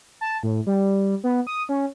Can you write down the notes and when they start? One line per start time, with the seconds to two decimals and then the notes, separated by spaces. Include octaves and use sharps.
0.21 A5
0.43 A2
0.67 G3
1.24 B3
1.47 D#6
1.69 C#4